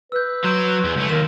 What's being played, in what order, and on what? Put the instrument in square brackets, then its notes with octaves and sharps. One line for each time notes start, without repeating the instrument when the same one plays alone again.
[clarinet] B4 [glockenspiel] E6 G6
[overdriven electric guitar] F#3 [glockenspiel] C6 G6 D7
[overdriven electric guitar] E2
C#2 A3
[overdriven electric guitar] D#2 [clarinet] A#4 [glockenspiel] E7